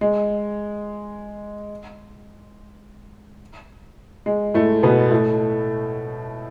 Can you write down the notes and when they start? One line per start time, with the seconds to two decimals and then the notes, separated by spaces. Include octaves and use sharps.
0.01 G#3
4.26 G#3
4.54 A2 A3
4.83 B2 B3
5.11 A2 A3